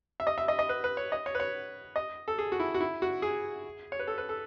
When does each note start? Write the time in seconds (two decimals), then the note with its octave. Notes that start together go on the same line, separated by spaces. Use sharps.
0.20 E5
0.27 D#5
0.38 E5
0.48 D#5
0.59 D#5
0.69 B4
0.84 B4
0.97 C#5
1.12 D#5
1.26 C#5
1.35 B4
1.40 C#5
1.96 D#5
2.28 A4
2.38 G#4
2.52 F#4
2.60 E4
2.74 F#4
2.81 E4
3.02 F#4
3.22 G#4
3.92 C#5
3.99 B4
4.07 A4
4.18 B4
4.29 A4